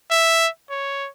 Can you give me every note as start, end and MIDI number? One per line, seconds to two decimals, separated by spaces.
0.11 0.48 76
0.70 1.09 73